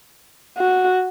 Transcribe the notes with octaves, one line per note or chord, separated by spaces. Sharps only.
F#4